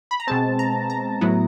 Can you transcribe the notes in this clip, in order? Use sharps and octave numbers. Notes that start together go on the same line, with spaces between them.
B5
A#5
B2 G#3 C4 A5
A#5
A#5
A2 F#3 B3 E4